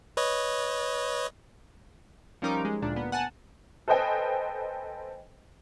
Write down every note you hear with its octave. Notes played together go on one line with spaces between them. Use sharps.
B4 C#5 D#5
F3 G3 C#4 D#4 A#4 D6
G#3
D2 A#2 D4
A#3 B3
F#5 G#5 A5
A4 B4 C5 D#5 G5 G#5